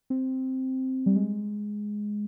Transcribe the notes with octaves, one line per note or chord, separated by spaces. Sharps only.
C4
G3
G#3